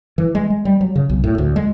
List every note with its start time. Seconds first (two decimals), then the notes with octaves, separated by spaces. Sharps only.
0.18 E3
0.35 G#3
0.50 G#3
0.65 G3
0.81 F#3
0.96 C#3
1.09 B1
1.24 A2
1.38 D2
1.56 G#3